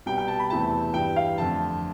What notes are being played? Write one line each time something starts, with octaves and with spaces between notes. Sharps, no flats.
C2 B2 G3 G5
G5
A5
B5
E2 C3 E3 A3 A5
G2 E3 G3 G5
F5
F2 D3 F3 A3 A5